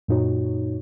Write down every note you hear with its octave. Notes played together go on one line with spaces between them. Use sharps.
F#2 A#2 D#4 F#4 C#5